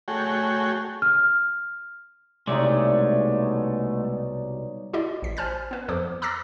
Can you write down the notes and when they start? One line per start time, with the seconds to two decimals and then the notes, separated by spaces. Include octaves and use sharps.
0.08 A3 F#4 G#4 C#5 G5
1.02 F6
2.47 C2 B2 G#3 A3 D#4 C#5 D5
4.93 E4 F#4 G4 D5 D#5
5.22 A1 B6
5.37 C5 G#5 A5 F6 G6 A6
5.71 B3 B4
5.88 F2 F3 A4 C5 D6
6.22 A#5 D6 E6 F6 A6 A#6